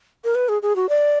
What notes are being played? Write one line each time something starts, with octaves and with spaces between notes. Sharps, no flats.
A#4
B4
G#4
G#4
F#4
D5